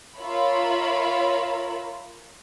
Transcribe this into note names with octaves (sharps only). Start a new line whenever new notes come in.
F4 A#4 C#5 E5 B5